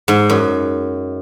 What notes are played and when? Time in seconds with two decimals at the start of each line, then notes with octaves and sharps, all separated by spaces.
0.08 G#2
0.30 F#2